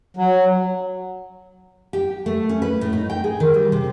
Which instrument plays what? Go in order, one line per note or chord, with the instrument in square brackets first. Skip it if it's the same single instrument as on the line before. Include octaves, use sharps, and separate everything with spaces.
[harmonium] F#3
[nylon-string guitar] G4
A3
C#4
B4
A2
D#4
G5
G#4
D#3
G3
C3